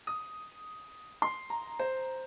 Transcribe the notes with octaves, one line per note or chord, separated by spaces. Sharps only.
D#6
C6
A#5
C5